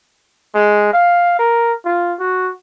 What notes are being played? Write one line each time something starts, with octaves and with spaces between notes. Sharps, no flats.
G#3
F5
A#4
F4
F#4